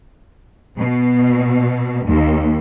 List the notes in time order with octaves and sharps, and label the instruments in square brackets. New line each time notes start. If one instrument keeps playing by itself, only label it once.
[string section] B2
D#2